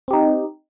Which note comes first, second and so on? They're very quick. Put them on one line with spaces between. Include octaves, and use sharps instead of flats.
C4 G4 D#4